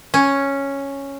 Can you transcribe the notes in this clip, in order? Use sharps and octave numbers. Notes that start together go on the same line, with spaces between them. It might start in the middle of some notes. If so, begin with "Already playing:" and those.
C#4